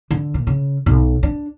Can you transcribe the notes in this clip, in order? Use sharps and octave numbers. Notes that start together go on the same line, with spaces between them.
D3
A#2
C#3
B1
D4